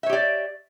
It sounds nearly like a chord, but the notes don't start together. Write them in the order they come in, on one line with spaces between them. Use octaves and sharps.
E5 C#5 G4 D5